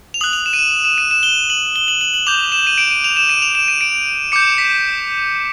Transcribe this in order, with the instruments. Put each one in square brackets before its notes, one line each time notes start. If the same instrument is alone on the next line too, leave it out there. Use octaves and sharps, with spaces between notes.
[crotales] F7
D#6 F#6 F#7
F7
E7
D#7
E7
E7
D#7
E7
G7
F#7
G7
F#7
F#7
F#7
D6 G6 F7
E7
D#7
D7
D#7
F7
E7
D#7
F7
E7
D#7
D7
D6 G6 C#7
B6